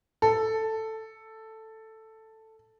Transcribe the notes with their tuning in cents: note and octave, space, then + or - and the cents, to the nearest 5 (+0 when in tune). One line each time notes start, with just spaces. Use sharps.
A4 +5